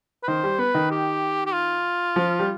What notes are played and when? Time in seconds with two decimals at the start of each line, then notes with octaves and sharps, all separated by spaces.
0.23 B4
0.28 D#3 C5
0.44 G3
0.59 B3 B4
0.75 D#3
0.91 G4
1.46 G4
1.53 F4
2.16 F3
2.39 G3